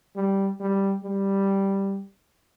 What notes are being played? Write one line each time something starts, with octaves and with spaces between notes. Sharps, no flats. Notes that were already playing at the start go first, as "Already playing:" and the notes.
G3
G3
G3